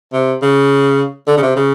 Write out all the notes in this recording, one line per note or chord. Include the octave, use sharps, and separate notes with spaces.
C3
C#3
D3
C#3
C3
C#3